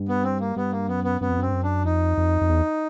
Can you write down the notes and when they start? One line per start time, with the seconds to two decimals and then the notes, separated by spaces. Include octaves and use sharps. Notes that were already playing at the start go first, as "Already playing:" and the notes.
Already playing: G2
0.08 B3
0.23 C4
0.40 A#3
0.56 G2 B3
0.72 A#3
0.88 F#2 B3
1.04 B3
1.21 F#2 B3
1.29 F2
1.38 F#2 C4
1.48 G2
1.53 F#2
1.63 D4
1.85 F2 D#4
2.18 F2
2.41 F2
2.49 E2